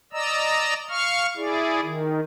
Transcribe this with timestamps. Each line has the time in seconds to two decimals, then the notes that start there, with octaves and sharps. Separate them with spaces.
0.13 D5 D#5 A#5 E6
0.89 F5 C#6 F6
1.37 E4 G#4 D5
1.82 D#3